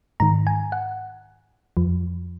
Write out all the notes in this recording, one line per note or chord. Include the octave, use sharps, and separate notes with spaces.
G#2 D#3 A#5
G#5
F#5
F2 F3